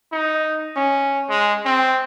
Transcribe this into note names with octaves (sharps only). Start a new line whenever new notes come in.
D#4
C#4
G#3
C4